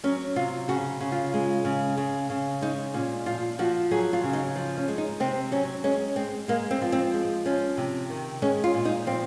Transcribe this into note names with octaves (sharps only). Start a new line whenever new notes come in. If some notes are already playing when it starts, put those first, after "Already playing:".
F#3 C#4
C3 F4
C#3 F#4
C#3
F4
G#3
C#3
C#3
C#3
G#3 D#4
A#2 C#4
F3 F4
F3 F#4
F#3 G#4
F4
C#3
D#4
F3
C#4
G#3
D#4
C3 C4
F#3 C#4
G#3 C#4
G#3 C4
G#3 A#3
C4
F3
C4
G#3
F3 C#4
C3
D#3
G#3 C#4
F4
A#2
D#4
F3 C4